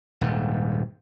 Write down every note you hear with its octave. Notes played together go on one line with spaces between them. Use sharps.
D#1 G#2